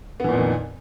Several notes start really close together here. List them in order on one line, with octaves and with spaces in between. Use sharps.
B3 E3 A#2 F2 D#3